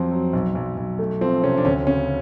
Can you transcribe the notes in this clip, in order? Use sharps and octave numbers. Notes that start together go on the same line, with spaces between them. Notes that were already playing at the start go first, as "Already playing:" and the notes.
Already playing: F2 F#3 C4
F#3
B1
B1
B1
A3
F3 C4
C3 C#4
D4
D2 C#4
C#3 C#4